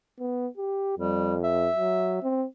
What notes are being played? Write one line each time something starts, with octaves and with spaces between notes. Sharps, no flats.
B3
G4
F2 G3
E5
F#3
C4